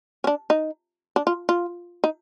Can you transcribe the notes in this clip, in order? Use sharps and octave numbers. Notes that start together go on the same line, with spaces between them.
C#4
D4
D#4
D4
F4
F4
D#4